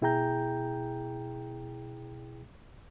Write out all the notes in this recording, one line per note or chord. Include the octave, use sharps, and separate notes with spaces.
B2 E4 G#4 G5 A#5 G6